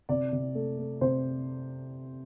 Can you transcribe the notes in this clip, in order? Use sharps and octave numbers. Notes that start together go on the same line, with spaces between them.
C3 D5
C3
A3
A3
C3 C5